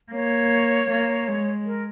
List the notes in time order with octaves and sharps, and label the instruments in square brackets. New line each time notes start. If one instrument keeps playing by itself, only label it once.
[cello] A#3 [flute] C#5
[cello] A#3
G#3
[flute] A#4